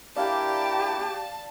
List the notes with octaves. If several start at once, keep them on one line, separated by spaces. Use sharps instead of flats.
A#3 D4 E4 G4 D5 F5 A5